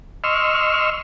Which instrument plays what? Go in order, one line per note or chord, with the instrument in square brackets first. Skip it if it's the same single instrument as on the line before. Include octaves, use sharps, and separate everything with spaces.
[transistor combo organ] D#5 C6 C#6 E6 F6